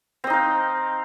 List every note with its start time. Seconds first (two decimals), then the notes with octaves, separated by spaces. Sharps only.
0.24 C4
0.27 D#5
0.30 D#4
0.33 F5